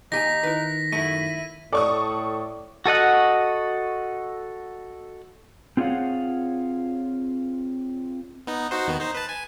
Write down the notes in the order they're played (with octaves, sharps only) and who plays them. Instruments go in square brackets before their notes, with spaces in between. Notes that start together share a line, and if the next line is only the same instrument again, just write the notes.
[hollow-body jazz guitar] D#2 G4 G#5 [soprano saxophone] D#4 [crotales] A#6 B6
[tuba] D#3 [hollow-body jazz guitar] E4 B4 [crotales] B6
[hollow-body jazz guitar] F#2 A3 [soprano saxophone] E4 [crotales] D#7
[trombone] A2 [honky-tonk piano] A4 C#6 D#6 [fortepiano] D5
[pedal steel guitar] F#4 A4 D#5 F#5
[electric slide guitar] C4 F4 G#4 C#5 F5 F#5
[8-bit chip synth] B3 D#4
D#4 F#4 C5
D#2 D#3 B3
D#4 C5
B4 A5
G#5